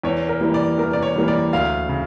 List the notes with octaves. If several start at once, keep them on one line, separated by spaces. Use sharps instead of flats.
E2 C#5
A#4
E3 G3 A#3
D5
E2 A#4
D5
C#5
E3 G3 A#3
D5
D2 F5
C#3